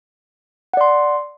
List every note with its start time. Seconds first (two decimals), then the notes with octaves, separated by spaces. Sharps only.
0.74 F#5
0.77 D5
0.81 C6